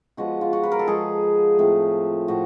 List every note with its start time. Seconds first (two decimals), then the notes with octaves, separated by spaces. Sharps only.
0.17 F3 G#3 B3 F#4
0.41 F4
0.53 F#4
0.63 B4
0.72 A#4
0.79 A4
0.88 F3 G#3 B3 G#4
1.58 A2 F3 A3 C4
2.28 A2 F3 A3 C4 F#4